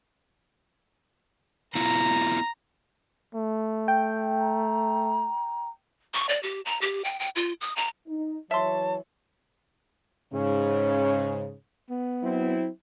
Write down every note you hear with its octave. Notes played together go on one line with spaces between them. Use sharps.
B3 E4 F4 A#5
A3
G5
A#5
C#6
D5
G4
A#5
G4
G5
G5
F4
D#6
A#5
D#4
E3 F#3 C#5 E5 A5 C6
G#2 C#3 C#4
B3
F#3 C4 E4